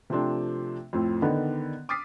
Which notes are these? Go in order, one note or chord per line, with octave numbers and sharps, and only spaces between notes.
C3 F3 A3 C4 D4
F2 A2 C4
D3 D#3 B3 D#4
D6 D#6 F6 A6 B6 C7